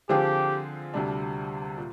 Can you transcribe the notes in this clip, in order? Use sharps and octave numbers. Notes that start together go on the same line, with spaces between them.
D3 F3 C4 F4 G4 G#4
D2 C3 G3 D4
A#2